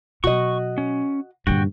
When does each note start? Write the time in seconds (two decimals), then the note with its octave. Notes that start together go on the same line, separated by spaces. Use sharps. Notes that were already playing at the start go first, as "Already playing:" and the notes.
0.24 B2 F#3 F#4 D#5 C#6
0.78 C#4
1.47 G2 A#2 D3 F#4 G5